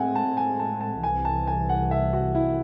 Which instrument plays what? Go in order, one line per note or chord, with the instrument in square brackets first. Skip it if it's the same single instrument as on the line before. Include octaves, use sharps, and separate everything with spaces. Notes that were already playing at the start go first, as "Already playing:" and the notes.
Already playing: [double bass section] A2 G#3 C4 [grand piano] E5 F#5 G#5
[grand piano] A5
G#5
A5
A5
[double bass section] C2 C3 E3 [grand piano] G#5
[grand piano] A5
G#5
F#5
E5
F#4
E4